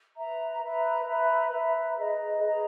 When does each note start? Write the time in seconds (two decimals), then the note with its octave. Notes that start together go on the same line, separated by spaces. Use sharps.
0.17 B4 E5 A#5
0.62 B4 E5 A#5
1.07 B4 E5 A#5
1.52 B4 E5 A#5
1.97 G#4 B4 D#5 A#5
2.42 G#4 B4 D#5 A#5